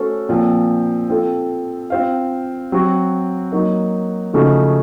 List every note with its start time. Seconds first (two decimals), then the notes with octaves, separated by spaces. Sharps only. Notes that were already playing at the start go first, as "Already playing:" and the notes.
Already playing: A3 C#4 F#4 A4 C5
0.29 A#2 F3 C4
1.10 C4 F4 A4
1.90 C4 F4 C5 F5
2.72 F#3 C4 F#4
3.52 F#3 A#3 D#4 F#4
4.33 C#3 F3 A3 D#4 F#4